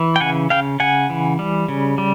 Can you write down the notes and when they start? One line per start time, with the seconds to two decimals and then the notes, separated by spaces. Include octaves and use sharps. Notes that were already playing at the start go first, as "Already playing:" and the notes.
Already playing: E3
0.16 G5
0.20 C#3 F#5 G#5
0.50 C#3 F5 G5
0.80 C#3 F#5 G#5
1.10 E3
1.39 G3
1.68 C#3
1.98 G3